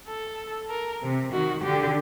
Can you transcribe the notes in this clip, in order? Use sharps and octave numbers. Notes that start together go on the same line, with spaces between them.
A4
A#4
C3
D#3 F#4
D3 G4